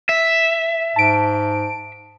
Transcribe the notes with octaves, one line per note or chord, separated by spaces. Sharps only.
E5
G#2 A5 D7